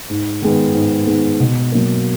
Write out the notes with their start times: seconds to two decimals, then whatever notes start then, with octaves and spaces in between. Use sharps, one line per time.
0.10 G#2
0.42 D#3 G#3 B3
0.74 G#2
1.07 D#3 G#3 B3
1.40 B2
1.72 F#3 A#3